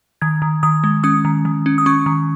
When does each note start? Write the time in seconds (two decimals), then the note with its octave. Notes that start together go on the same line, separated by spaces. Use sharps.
0.21 D#3 G#6
0.42 D#3
0.63 D#3 D#6
0.84 G#3
1.03 C#4 D#6
1.25 D#3
1.45 D#3
1.66 C#4
1.78 D#6
1.86 C#4 C#6
2.06 D#3